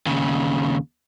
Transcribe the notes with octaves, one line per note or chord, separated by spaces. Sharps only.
D#2 C#3